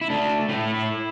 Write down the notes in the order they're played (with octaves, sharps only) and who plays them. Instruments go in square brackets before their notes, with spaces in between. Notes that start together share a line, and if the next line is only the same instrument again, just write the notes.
[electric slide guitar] E4
A3 D4
A3 E4